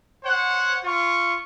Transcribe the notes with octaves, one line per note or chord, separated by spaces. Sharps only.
C5 C#5 F#5
F4 C#6